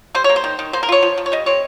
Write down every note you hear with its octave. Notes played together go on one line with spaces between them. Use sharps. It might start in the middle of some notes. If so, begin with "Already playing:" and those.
G3 C5
C#5
A#3
C5
D#3
D#3
A#3 C5
A#4
F4 C#5
F3
F3
C#5
G3 D#5
C4 C#5